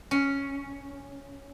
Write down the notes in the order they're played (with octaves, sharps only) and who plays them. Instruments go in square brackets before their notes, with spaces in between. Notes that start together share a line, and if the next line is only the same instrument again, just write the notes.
[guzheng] C#4